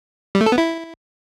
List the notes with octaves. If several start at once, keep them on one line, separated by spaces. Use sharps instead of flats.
G3
A3
A4
B3
E4